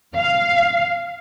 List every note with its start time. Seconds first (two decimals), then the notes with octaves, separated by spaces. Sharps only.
0.16 F5